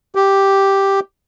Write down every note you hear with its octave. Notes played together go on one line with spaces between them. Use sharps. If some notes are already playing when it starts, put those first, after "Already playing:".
G4